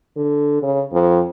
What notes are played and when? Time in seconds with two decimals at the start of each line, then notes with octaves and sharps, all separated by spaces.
0.17 D3
0.62 C#3
0.92 F2